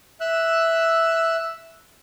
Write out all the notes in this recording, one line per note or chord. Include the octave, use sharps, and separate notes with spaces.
E5 E6 F#6